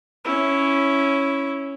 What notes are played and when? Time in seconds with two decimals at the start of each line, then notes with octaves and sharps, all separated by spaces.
0.25 C#4 E4